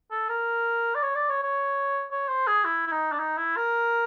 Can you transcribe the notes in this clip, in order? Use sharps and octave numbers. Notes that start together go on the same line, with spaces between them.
A4
A#4
D5
C#5
D5
C#5
C#5
C#5
C5
G#4
E4
E4
D#4
D4
D#4
E4
A#4